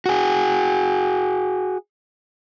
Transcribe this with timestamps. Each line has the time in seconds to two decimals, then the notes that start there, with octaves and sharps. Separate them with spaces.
0.06 F#4 G#4